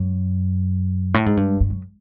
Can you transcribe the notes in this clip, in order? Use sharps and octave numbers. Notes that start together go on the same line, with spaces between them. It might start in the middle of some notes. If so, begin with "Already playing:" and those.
Already playing: F#2
A2
G#2
G2
G2
F#2